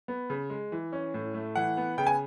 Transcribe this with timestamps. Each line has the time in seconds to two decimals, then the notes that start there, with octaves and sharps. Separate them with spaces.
0.08 B3
0.30 C#3
0.50 G#3
0.72 E3
0.93 C#4
1.14 A2
1.34 A3
1.55 E3 F#5
1.77 B3
1.98 C#3 G5
2.07 G#5